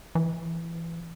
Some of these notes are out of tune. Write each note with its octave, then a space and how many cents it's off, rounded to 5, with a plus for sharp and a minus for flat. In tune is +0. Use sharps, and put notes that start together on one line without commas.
E3 +20